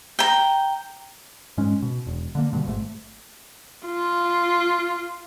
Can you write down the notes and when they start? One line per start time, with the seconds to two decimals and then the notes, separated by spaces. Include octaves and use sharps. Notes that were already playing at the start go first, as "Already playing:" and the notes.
0.19 G5 A#5
1.58 G#2 G#3 C#4
1.82 B2
2.07 E1
2.35 D3 A3 A#3
2.53 G2 B2 D3
2.66 G#1 G#2 A3
3.86 F4